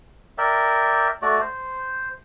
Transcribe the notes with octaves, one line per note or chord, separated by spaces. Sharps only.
A#4 D5 E5 G5
A3 F#4 D5
C5